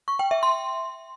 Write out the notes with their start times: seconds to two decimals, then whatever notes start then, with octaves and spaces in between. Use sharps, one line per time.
0.08 C#6
0.19 G5
0.31 E5
0.43 C6